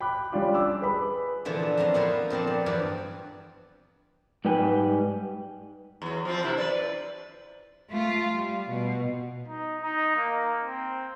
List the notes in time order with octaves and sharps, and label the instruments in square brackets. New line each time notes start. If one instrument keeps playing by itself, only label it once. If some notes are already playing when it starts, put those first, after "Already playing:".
[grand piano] G5 B5 D6 F#6
G3 C#4 D4 F4 G4
D6 E6
G#4 B4 B5
[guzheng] A#2 D3 E3 F3 B3
F2 A2 A#5 C6
A#3 B3 E4 F4 B4 C5
F2 A#2 C4 D5
B3
E2 G2 F3 F#4 B4 D5
[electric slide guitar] G#2 G3 B4 G5 G#5
[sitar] E2 F#3
F3 C4 F4
F#2 C3 E4
B4 D5
[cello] A3 F4
G3
B2
[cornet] D#4
D#4
A#3
C4